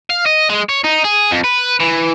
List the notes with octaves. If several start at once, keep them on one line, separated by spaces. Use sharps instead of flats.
F5
D#5
G#3
C#5
D#4
G#4
F2
B4
E3